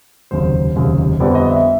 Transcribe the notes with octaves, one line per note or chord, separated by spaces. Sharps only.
F1 D#2 C#3 F#3 C5
F1 D#2 C#3 F#3
F2 D3 G3 B3 D5
D#5
E5